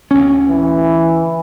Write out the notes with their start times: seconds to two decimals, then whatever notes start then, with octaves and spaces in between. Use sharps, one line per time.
0.11 D2 C#4
0.50 E3